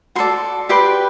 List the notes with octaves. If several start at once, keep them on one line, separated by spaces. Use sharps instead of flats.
F#4 A4 D5 C6
G4 B4 D5 C6